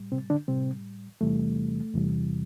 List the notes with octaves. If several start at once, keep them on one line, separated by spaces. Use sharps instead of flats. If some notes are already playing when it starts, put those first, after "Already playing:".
Already playing: A2 G3
C3 C4
D3 D4
A2 C3 G3 C4
E2 C3 E3 G3 A3
E2 C3 E3 G3